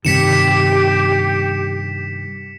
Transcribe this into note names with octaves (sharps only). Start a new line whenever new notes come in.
G2 C3 D#3 G4 B6 C#7 E7